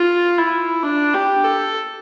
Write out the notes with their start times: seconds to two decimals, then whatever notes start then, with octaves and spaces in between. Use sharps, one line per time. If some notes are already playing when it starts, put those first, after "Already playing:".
Already playing: F4
0.38 E4
0.83 D4
1.14 G4
1.44 A4